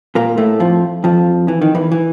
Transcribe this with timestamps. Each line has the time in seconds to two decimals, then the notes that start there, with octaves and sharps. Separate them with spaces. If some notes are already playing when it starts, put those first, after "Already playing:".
0.15 A#2 A#3
0.38 A2 A3
0.60 F2 F3
1.04 F2 F3
1.48 E3
1.62 D#3
1.75 E2 E3
1.92 E3